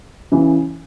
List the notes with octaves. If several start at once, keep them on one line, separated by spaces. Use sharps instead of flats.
C#3 E3